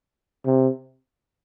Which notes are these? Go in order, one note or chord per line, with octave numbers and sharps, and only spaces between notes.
C3